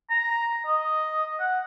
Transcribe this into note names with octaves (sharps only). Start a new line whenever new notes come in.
A#5
D#5
F#5